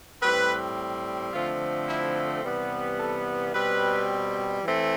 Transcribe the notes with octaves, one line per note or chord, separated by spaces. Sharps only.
A2 G3 C4 B4
D3 F3 A3 C4 F4
E4
C3 E3 G3 B3
A4
B2 G3 C4 B4
E3 A3 C4